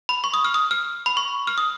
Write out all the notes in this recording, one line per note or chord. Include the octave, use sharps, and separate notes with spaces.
B5
C#6
D#6
F6
D#6
F6
B5
C#6
F6
D#6